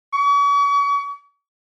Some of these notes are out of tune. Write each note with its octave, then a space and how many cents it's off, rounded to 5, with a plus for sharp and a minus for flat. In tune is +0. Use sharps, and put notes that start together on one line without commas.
C#6 +40